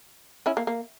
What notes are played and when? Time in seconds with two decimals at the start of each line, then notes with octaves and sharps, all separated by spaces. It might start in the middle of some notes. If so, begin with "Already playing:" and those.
0.46 C#4 E4
0.57 A#3
0.67 A#3